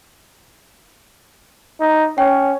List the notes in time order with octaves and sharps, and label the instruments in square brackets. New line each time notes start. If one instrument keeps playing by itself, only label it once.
[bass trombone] D#4
[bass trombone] C#4 [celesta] C#5 G5